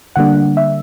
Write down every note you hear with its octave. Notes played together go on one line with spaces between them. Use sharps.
D3 G3 A#3 D4 F#5
E5